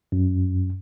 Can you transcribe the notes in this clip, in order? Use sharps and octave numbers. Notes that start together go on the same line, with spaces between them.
F#2